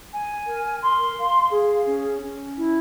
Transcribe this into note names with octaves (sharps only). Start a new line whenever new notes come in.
G#5
A#4
C6
F5
G#4
C#4
C#4
E4